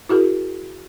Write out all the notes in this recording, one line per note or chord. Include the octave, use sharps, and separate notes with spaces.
E4 F#4 G#4 A#4